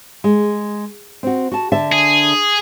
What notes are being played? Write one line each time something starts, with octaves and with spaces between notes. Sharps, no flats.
G#3
C4 F#4
F#4 A5
D3 E5 A5
G#4